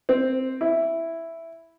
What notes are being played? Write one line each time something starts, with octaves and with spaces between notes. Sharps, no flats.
C4
E4